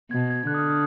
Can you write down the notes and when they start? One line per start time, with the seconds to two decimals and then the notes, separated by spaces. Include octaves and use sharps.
0.11 B2 G#6
0.30 G#6
0.47 D3 F#6
0.54 D#6
0.59 F6
0.71 D#6